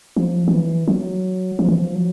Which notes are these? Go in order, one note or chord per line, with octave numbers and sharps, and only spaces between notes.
F3
F3
E3
F#3
F3
E3
F3
F#3